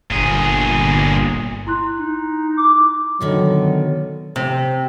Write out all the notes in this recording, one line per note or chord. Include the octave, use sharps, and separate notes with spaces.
G1 A#2 G#4
E4 C6 F#6
D#4
D6
B2 D3 D#3 F#3
C3